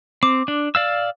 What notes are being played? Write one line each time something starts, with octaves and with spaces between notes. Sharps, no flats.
C4 D6
D4
D5 F5 E6